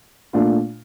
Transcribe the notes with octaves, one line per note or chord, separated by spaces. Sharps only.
A#2 A3 D4 F4